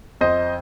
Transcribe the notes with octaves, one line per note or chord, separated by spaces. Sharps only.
F2 C5 D#5